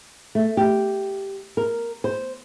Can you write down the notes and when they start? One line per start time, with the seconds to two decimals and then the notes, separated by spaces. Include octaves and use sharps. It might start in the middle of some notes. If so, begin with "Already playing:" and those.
0.35 A3
0.57 G4
1.57 A#4
2.04 C5